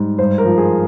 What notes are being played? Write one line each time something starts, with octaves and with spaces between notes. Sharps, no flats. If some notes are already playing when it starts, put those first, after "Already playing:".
Already playing: G#2 G3
G2 C5
A#4
F3
G#4